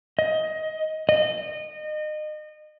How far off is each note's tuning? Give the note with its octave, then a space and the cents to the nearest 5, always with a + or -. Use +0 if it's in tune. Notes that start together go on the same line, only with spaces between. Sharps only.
D#5 +15
D#5 -30